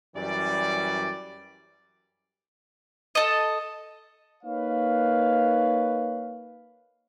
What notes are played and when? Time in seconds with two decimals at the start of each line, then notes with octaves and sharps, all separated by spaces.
0.16 F#2 E3 G3 D5
3.15 A4 D#5
4.44 A#3 D#4 B4 C#5 F5